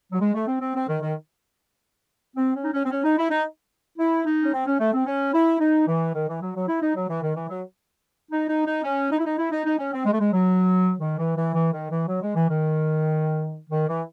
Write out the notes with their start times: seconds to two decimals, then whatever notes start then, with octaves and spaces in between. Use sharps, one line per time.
0.12 F#3
0.21 G#3
0.34 A3
0.48 C4
0.61 C4
0.75 C4
0.88 D#3
1.01 D#3
2.36 C4
2.55 C#4
2.64 D#4
2.73 C#4
2.85 C4
2.91 C#4
3.04 D#4
3.17 E4
3.31 D#4
3.98 E4
4.26 D#4
4.42 C#4
4.53 C4
4.66 C#4
4.79 A3
4.93 C4
5.06 C#4
5.33 E4
5.60 D#4
5.87 E3
6.14 D#3
6.28 E3
6.42 F#3
6.55 F#3
6.68 E4
6.81 D#4
6.95 F#3
7.09 E3
7.22 D#3
7.36 E3
7.49 F#3
8.31 D#4
8.48 D#4
8.66 D#4
8.84 C#4
9.11 D#4
9.18 E4
9.25 D#4
9.38 E4
9.51 D#4
9.65 D#4
9.79 C#4
9.93 C4
10.06 G#3
10.13 A3
10.19 G#3
10.33 F#3
11.00 D#3
11.18 E3
11.36 E3
11.55 E3
11.72 D#3
11.90 E3
12.08 F#3
12.22 G#3
12.35 E3
12.49 D#3
13.70 D#3
13.88 E3